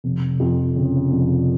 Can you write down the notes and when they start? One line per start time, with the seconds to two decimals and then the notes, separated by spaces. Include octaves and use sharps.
0.04 F1
0.40 F2
0.76 C#3
1.11 F1